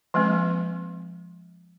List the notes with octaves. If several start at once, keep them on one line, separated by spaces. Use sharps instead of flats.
F3 G#3 A#3 C4